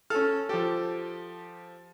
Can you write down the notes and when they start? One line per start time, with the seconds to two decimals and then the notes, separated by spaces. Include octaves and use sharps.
0.10 C#4 A4 F6
0.49 F3 G4 A4